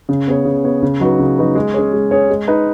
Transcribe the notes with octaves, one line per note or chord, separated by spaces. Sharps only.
C#3
B3 G#4 C#5
C#3
B3 G#4 C#5
C#3
F#3 D#4 F#4 B4
C#3
F#3 D#4 F#4 B4
G#3
C#4 G#4 C#5
G#3
C#4 G#4 C#5
G#3
D#4 B4